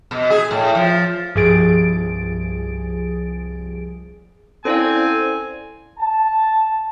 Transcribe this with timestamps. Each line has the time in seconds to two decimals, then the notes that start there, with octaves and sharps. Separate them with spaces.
0.11 B2
0.30 G#4
0.51 A2
0.75 F3
1.35 C2 G2 F3 G#4 A6 D7
4.65 C4 C#4 E4 A4 C5 D5 F5 G#5
5.99 A5